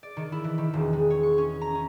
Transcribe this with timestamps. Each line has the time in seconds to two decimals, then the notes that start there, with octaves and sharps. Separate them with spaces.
0.03 D5
0.17 D#3
0.32 E4
0.44 E3
0.58 D#3
0.73 E1
0.93 G#3
1.10 C#5
1.23 C#6
1.38 C#4
1.61 A#5
1.75 C#4